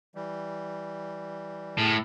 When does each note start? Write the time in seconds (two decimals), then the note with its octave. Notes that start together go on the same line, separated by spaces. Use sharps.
0.15 E3 G3
1.78 A2 G#4 F6